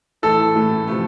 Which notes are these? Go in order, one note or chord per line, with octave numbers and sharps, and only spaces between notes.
A2 E3 A3 A4
A2 E3 A3
C3 F3 A3